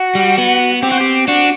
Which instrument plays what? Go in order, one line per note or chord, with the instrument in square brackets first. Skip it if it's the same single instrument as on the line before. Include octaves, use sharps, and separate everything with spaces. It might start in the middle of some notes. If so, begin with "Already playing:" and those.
Already playing: [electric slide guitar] F#4
[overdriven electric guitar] G3
B3
[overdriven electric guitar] C4 [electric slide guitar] G4
[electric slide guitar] F#4
G4
[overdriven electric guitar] D4 [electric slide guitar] F#4